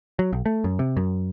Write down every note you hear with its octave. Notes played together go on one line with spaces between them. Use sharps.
F#3
B1
A3
F#2
C3
F#2